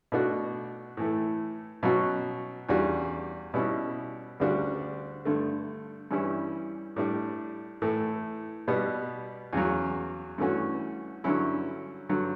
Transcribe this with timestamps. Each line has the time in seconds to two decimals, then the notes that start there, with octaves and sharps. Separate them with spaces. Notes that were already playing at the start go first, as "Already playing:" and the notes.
0.12 B2 A3 D4 F#4
0.97 A2 E3 A3
1.83 B2 F#3 C#4 F#4
2.69 E2 C#3 G3 D4 F#4
3.54 B2 G3 C#4 E4
4.40 D2 C#3 G3 D4 F#4
5.25 G2 D3 A3
6.11 G2 E3 G3 C#4 E4
6.96 A2 G3 D4
7.82 A2 E3 A3
8.68 B2 G3 B3
9.53 E2 C#3 F#3
10.38 G2 E3 A3 C#4 F#4
11.24 G2 D3 F#3 C#4 E4
12.09 G2 D3 F#3